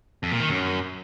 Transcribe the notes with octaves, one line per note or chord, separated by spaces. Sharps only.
F2
A#2
D#3
F#2